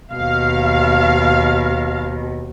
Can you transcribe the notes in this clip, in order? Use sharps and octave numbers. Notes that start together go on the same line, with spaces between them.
D#2 B2 F5